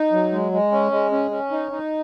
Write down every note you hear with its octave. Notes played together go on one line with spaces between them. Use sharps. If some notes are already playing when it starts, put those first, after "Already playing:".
Already playing: D#4
F#3
G#3
G#3
C#4
G#3
C#4
C#4
D#4
D#4